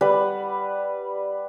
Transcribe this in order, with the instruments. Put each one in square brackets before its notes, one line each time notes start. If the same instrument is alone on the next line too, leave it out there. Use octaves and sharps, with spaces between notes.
[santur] G3 B4 F#5